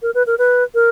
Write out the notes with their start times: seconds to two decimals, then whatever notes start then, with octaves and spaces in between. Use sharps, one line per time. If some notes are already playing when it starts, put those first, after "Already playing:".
0.02 A#4
0.14 B4
0.27 A#4
0.38 B4
0.75 A#4